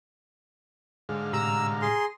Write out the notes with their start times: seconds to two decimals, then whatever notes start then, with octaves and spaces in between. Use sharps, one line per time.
1.09 G#2 D3 G#4 F5
1.33 A2 C3 G4 A#5 E6
1.82 G#4 C6